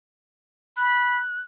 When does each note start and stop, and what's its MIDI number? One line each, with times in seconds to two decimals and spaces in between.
0.77 1.20 83
0.77 1.41 90